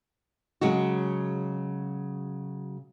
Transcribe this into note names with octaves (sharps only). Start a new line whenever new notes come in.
C#3 F#3 G#3 F#4